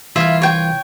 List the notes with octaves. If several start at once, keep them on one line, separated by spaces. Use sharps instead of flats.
C2 E3 F4 E5 F5
C#5 G5